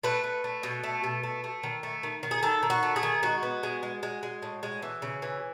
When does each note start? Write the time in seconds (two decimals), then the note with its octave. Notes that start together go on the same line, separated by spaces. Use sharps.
0.03 A3 B4
0.24 A3
0.44 A3
0.63 B2
0.83 A3
1.04 B2
1.23 A3
1.44 A3
1.63 D#3
1.83 A3
2.03 D#3
2.23 D#3
2.31 G#4
2.43 D#3 A4
2.63 D#3
2.70 F#4
2.83 A3
2.96 G#4
3.03 D#3
3.23 G#3 F#4
3.43 B3
3.63 G#3
3.83 G#3
4.03 G#3
4.23 G#3
4.42 A2
4.63 G#3
4.82 E3
5.02 C#3
5.22 E3